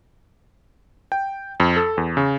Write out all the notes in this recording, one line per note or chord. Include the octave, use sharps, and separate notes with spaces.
G5
F2
A4
E2
C#3